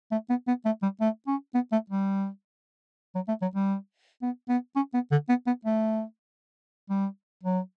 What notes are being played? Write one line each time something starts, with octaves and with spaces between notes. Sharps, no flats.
A3
B3
B3
A3
G3
A3
C#4
B3
A3
G3
F#3
A3
F#3
G3
B3
B3
C#4
B3
D3
B3
B3
A3
G3
F#3